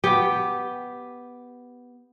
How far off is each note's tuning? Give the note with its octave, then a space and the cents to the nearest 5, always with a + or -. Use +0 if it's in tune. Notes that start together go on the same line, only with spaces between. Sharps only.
B3 +0 G4 +0